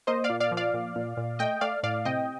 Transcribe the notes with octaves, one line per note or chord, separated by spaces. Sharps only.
A#3 C5 D#5
D5 F5
A#2
D5 F5
F3
D5 F5
A#2
A#2
A#2
A3 D#5 G5
A3 D5 F5
A2 D5 F5
C3 D#5 G5